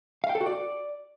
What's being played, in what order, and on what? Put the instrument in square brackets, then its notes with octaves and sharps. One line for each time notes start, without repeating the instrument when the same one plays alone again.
[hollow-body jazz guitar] F5
G5
A4
F#4
D5